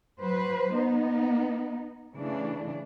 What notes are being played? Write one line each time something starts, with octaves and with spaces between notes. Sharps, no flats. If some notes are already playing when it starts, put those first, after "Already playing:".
F#3 B4 C5
B3 D#4
C#3 E3 A3 D4